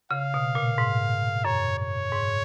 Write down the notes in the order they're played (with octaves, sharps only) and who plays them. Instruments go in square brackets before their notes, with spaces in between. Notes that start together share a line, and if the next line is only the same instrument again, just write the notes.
[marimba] C#3 [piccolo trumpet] F5
[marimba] B2
A#2
G#2
[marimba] F#2 [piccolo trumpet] C#5
[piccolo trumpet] C#5
[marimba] G#2